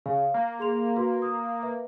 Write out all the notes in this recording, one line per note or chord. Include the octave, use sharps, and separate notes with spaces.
C#3 F5
A#3
G#4 C6 F7
F#4 B4 C6
D#6
B4 E5